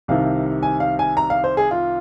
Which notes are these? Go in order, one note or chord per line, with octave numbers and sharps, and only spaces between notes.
C2 C3 D#3 F5
G#5
F5
G#5
A#5
F5
C5
G#4
F4